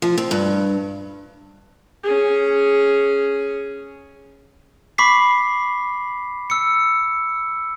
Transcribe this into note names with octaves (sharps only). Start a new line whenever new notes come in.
F3
C4
G2
C#4 G#4
B5 C#6 D6 B6 C7
E6 C#7